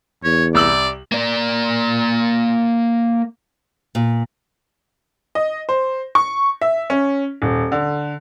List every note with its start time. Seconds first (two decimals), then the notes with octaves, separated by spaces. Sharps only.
0.24 E2 C#5
0.55 C2 D5 E6 F#7
1.12 A#3 D5
3.95 A#2
5.35 D#5
5.69 C5
6.15 C#6
6.62 E5
6.90 C#4
7.42 D#1
7.72 D3